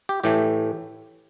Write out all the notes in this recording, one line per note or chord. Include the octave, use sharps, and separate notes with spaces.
G4
A2 E3 A3 G4